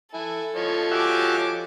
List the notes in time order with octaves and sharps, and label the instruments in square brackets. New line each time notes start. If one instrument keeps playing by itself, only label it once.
[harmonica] E4 G#5 [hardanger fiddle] A4
[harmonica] F3 C#5 D#5
[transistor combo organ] F#4 G4 E5 [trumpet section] G#5 D6